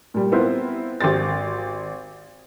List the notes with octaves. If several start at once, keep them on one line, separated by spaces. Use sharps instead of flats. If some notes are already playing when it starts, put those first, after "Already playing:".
A#2 G3
B3 C4 E4 F4 A#4 C5
G#1 G4 C5 A6